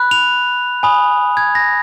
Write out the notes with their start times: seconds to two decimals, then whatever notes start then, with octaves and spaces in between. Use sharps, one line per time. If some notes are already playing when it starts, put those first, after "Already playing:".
Already playing: B5 F#6
0.11 F7
0.83 G#5 B5 D#6
1.37 G#6
1.55 A#6